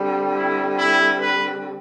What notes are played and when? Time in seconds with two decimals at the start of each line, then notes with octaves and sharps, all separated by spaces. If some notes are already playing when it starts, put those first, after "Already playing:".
Already playing: D3 G3 C4
0.36 E4
0.78 E4
1.19 B4